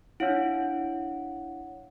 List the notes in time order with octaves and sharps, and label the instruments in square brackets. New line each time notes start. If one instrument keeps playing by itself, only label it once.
[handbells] D4 E4 [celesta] C#5 F5 F#5